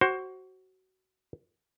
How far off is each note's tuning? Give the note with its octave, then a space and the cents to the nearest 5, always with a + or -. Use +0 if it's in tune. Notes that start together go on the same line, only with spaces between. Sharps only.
F#4 +20 C5 +20